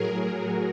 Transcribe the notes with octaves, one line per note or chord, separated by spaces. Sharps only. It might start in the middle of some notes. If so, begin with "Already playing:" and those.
Already playing: A2 F#3 G#4 A#4
F#4 G#4